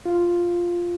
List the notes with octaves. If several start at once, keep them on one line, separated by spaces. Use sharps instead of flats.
F4